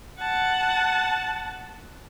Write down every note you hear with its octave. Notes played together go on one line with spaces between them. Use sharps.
F#5 A5